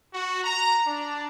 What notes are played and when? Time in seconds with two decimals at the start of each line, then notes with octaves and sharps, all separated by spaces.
0.14 F#4
0.44 A#5
0.86 D4